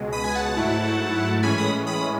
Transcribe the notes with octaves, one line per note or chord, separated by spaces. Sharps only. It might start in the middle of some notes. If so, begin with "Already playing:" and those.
Already playing: C#2 B2 G#3
B5 D#6
G#5
F#5 A5
G#2 F#3 A3 E4
A2 E3 G#3 C#4 G#5 B5
B5 D#6
B5 D#6